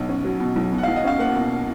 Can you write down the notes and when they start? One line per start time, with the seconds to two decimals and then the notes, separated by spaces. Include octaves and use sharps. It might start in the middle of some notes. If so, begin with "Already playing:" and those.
Already playing: B1 B2
0.09 C#4
0.24 F#3
0.40 B2
0.56 B1
0.72 B2
0.78 F#5
0.83 F5
0.88 B1
0.96 D#5
1.04 C#4 F5
1.19 A#3 F#5
1.35 B2